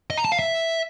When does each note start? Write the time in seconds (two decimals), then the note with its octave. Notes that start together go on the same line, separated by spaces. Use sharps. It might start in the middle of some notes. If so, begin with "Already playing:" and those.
0.10 D#5
0.17 A#5
0.25 A5
0.32 F5
0.39 E5